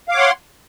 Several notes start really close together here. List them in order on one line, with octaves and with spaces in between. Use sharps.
F5 D6 C#5 F#5 C6